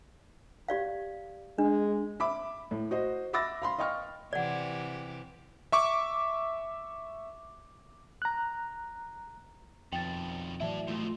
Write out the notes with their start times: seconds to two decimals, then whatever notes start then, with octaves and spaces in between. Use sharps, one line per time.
0.68 G4 D5 F5
1.58 G#3 D4
2.20 E5 B5 D6
2.71 A2
2.91 F#4 C5 D#5
3.33 E5 B5 D6 E6 A6 A#6
3.62 F5 B5 C6
3.79 D#5 F5 G5 C#6 F6
4.33 C3 E3 G4 D5 F#5
5.72 E5 C#6 D6
8.22 A#5 F#6
9.93 F2 B2 D#3 G5 A6
10.60 A2 E3 F#3 E4 D5 E5 A5
10.88 F2 B2 A3 F4 C6